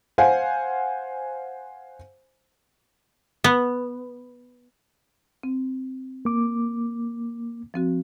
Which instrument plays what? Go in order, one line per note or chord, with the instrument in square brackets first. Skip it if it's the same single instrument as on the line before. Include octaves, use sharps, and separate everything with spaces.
[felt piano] C5 F5 F#5 G#5
[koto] B3
[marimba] C4
[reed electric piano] A#3 D6
[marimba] F3 C4 F#4